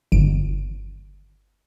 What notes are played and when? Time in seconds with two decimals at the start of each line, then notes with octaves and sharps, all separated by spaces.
0.12 G1 D7